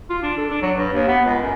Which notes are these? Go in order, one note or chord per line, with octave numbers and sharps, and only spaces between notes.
F4
D4
A4
D4
F#3
G2
D#2
B3
C#2
F#2